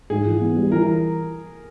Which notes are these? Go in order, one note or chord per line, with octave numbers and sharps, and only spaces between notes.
G#2 G#4
E3
B3
G3
E3 A#4
A#4